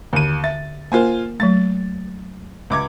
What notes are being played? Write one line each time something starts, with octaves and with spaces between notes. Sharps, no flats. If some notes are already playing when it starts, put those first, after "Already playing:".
D#2 D3 D#7
E5 A6
A#3 F4 A#4 C5 G#5
F#3 A3 A6
C#2 D6 G#6